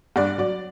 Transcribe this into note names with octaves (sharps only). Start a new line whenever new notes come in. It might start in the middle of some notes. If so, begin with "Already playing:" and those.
G2 D5
F#3 D5